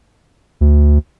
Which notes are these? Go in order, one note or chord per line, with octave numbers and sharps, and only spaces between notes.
D2